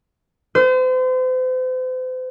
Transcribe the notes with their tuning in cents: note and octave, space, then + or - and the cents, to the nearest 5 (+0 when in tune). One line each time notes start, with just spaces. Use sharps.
C5 -40